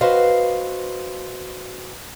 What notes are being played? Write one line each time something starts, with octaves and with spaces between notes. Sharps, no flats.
F#4 B4 C5 D#5 F5